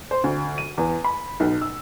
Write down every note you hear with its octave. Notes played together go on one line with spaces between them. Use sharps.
C5
D2
D#7
E2
B5
B1
E6